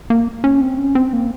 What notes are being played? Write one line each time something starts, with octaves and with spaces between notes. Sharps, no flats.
A#3
C#4
C4
C#4
C4
A#3